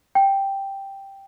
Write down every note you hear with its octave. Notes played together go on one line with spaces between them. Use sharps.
G5